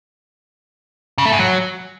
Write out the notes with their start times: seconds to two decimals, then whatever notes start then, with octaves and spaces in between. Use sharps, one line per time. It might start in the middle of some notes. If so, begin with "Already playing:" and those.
1.18 C#3
1.25 A3
1.32 G#2
1.39 F#3